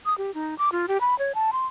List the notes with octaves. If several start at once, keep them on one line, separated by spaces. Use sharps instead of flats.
D#6
G4
D#4
D6
F4
G4
B5
C#5
A5
C6